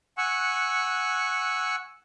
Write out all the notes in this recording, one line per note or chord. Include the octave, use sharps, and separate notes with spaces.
F#5 G#5 C#6 E6 F#6